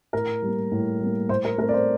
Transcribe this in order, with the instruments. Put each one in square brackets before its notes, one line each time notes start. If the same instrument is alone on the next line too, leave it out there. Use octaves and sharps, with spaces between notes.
[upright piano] A2 A#4
G3 A#3
A2
G3 A#3
A2 C5
A#4
A3 A#4
C4
D5
C5